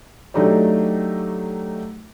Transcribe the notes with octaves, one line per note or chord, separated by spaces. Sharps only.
F#3 A3 D4 D#4 G4 C#5